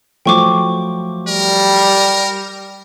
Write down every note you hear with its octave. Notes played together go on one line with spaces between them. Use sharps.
F3 F#3 A3 G5 C#6 D6
G3 A#4